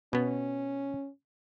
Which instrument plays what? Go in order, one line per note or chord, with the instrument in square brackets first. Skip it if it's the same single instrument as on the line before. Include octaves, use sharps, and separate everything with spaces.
[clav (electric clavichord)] B2 B3 [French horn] C#4